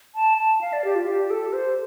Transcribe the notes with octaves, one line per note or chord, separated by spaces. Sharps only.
A5
A5
F5
D5
G4
F4
G4
A4
C5